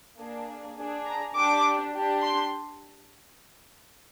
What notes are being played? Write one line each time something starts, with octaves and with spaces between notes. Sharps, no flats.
A#3 D4 G#4
D4 G#4
A#5
D4 G4 D6
D4 G4
C6